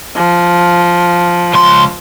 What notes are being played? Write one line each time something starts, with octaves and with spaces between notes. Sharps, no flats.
F3
C#2 C6